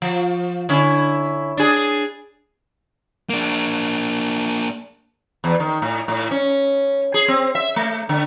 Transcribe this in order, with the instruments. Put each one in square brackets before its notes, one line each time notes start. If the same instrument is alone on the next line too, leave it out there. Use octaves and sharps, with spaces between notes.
[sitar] F3
D3 C#4 E4
D4 G#4
[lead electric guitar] A#3 D4
[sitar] E2
D#3
A2
A2
C#4
G#4
C4
E5
A3
D3